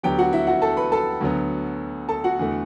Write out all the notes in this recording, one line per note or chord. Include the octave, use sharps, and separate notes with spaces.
D2 D3 F#3 B3 G4 G5
F#4 F#5
E4 E5
F#4 F#5
A4 A5
B4 B5
A4 A5
D2 D3 F#3 B3
A4 A5
F#4 F#5
E2 D3 A3